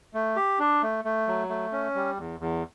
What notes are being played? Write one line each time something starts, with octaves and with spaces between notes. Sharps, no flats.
A3
G4
D4
A3
A3
F#3
A3
C#4
G3
E2
E2